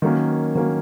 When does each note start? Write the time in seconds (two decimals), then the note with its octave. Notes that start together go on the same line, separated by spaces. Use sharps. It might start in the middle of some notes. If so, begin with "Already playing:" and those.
0.02 D#3 F#3 A#3 C#4
0.55 D#3 F#3 A#3 C#4